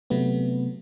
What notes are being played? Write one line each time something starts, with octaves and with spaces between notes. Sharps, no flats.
C3 F#3 A3 B3